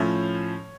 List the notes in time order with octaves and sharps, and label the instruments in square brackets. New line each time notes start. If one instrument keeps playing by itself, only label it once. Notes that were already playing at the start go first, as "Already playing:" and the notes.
Already playing: [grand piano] A2 F3 A3 C#4 C#5